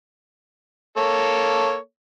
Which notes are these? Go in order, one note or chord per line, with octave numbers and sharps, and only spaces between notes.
A#3 A4 C#5